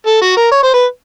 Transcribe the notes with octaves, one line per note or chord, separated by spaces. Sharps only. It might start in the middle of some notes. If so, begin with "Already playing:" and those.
A4
F#4
A#4
C#5
C5
B4